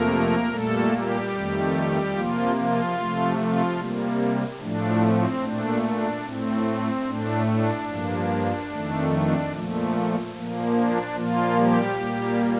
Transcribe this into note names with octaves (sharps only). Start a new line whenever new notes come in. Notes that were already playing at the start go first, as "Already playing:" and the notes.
Already playing: F2 C3 F3 A3 A#3 A#4
A#2 G3 A3 A#3 A4
G3 G4
F2 D#3 A3
C3 F3 A#3 F4
F3 F4
C3 F3 A3
F3 F4
C3 G3 A#3
A2 F3 A3 D4
C4
A#2 A3 D4
D4
A2 A3 C4
A2 A3 D4
D4
G2 F3 A#3
F2 D#3 A3
D4
A#2 F3 A3
A#2 F3 A#3
D4
A#2 F3 A#3 F4
G3 G4
A#2 G3 A#3